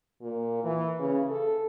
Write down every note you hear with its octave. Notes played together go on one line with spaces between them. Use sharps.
A#2
E3
C#3
A4